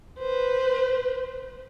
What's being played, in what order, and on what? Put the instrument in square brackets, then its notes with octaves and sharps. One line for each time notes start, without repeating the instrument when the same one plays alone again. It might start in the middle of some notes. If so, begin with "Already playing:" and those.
[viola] B4 C5